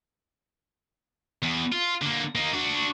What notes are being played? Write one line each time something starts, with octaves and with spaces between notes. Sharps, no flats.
E2
F4
D3 A#3
A#3 D#4
D4 F#4